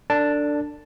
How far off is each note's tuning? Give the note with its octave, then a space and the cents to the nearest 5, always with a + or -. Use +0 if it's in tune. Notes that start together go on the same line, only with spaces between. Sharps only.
D4 +0 A4 +40 A5 +5